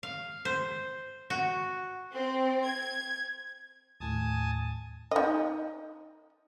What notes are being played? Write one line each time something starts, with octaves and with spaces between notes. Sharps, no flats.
F5
C5
F#4
C4
G#6
D#2 A2 G#5 A5 D#6
D#4 D#5